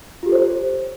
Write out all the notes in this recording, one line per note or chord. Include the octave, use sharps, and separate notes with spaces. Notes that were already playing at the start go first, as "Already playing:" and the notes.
F4 G4 A4 C5 C#5